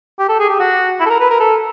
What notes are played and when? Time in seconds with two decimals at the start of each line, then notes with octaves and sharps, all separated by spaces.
0.19 G4
0.29 A4
0.39 G#4
0.49 G4
0.60 F#4
1.00 E4
1.06 A4
1.10 A#4
1.20 B4
1.30 A#4
1.40 A4